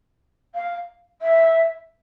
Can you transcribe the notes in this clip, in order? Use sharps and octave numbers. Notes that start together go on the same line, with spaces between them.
F5
E5